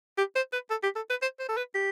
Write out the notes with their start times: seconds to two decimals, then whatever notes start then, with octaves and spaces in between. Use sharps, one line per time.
0.18 G4
0.35 C5
0.53 B4
0.70 A4
0.83 G4
0.95 A4
1.10 B4
1.22 C5
1.39 C5
1.49 A4
1.57 B4
1.74 G4